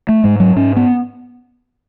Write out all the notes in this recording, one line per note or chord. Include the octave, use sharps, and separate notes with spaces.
A3
G#2 G#3
F#3
G#2 C#4
B3